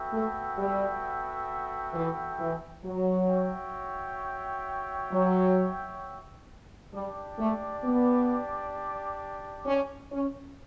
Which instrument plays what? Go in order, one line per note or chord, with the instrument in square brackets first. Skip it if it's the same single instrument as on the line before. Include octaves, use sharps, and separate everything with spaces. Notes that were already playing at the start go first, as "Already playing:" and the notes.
Already playing: [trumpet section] B3 F#4 A4 E5 G5
[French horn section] A3
G3
E3
E3
F#3
[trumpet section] F#4 C#5 E5 G5
[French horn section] F#3
[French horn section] G3 [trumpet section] D4 G4 D5
[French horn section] A3
B3
C#4
C#4